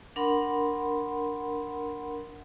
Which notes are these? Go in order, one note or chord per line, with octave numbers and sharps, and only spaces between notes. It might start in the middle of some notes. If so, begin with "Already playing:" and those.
D4 A#4 F#5 B5 C6